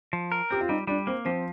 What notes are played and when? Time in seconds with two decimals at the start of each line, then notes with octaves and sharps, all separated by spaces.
0.13 F3
0.32 A#4
0.51 C4 G4
0.61 F4
0.69 G3 D#4
0.87 G3 D4
1.07 A#3 C4
1.25 F3 C4